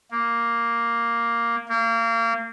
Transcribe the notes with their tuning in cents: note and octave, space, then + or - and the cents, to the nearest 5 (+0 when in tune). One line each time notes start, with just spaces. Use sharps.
A#3 +0
A#3 -30